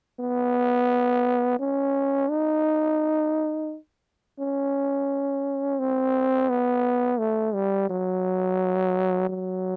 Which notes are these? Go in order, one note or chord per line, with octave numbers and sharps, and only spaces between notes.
B3
C#4
D#4
C#4
C4
B3
A3
G3
F#3
F#3